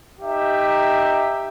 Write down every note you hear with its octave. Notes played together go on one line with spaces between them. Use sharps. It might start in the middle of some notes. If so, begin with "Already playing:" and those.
D#4 G4 E5